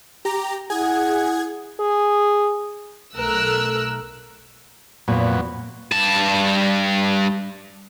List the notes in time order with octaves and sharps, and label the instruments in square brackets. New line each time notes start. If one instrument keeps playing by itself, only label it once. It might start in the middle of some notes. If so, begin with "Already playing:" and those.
[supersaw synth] G4 A#5
[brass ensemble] E4 F#5 [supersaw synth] G#4 G#6
[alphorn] G#4
[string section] B1 A3 A#4 E6 F#6
[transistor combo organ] F2 F#3 B3 [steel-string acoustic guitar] A#2
[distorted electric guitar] G2 A5